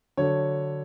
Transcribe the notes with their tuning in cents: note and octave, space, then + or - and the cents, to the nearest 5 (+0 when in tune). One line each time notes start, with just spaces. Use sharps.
D3 +0 F#3 +5 C#5 +0